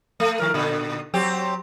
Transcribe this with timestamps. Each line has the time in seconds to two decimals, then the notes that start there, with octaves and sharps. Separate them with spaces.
0.20 A3
0.40 D#3 A#4
0.54 A#2 D3
1.14 F#3 C4 G4